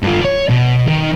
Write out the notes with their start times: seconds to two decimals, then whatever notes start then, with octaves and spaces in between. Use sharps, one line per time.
0.02 G2 F4
0.21 C#5 D5
0.50 B2
0.87 D#3